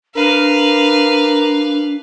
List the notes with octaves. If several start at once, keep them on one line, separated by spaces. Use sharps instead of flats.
D4 A#4 B4 F5